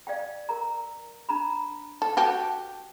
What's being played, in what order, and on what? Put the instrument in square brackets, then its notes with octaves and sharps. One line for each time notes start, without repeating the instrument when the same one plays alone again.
[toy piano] D5 F5 G5
A#4 A#5
D4 A#5 B5
[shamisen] A4
F#4 G4 A4